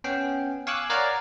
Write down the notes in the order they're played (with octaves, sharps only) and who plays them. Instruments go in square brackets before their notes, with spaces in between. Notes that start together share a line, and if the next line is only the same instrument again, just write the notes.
[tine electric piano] B3 C#4 G5
F5 G#5 C#6 D6 E6 F#6
A#4 C#5 D5 F5 F#5 A#5